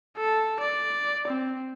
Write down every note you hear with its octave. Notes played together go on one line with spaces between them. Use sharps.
A4
D5
C4